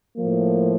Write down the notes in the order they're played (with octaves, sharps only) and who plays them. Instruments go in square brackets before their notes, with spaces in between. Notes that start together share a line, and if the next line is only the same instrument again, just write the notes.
[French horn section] A2 F3 A#3